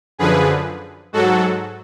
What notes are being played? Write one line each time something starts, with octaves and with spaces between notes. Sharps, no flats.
F#2 D3 F3 G#4 B4
G#2 F#3 F#4 A4